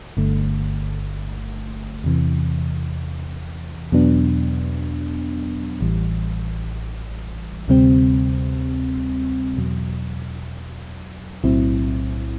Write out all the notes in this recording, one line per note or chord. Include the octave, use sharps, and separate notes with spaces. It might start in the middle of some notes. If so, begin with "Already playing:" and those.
G1 G2 D3 A3
E2 C3 E3
E2 B2 F#3 B3 D4
A1 A2 E3 G3
D2 C3 G3 C4
E2 B2 F#3
B1 A2 F#3 C4 E4